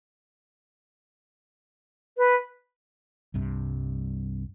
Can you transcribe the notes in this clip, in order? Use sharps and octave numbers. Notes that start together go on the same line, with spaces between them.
B4
C2 G2 C3